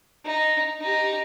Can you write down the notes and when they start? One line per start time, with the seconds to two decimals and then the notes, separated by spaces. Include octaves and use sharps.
0.25 D#4
0.81 D#4 G4